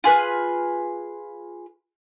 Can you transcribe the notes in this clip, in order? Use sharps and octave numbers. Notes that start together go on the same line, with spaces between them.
F4 G#4 B4 F#6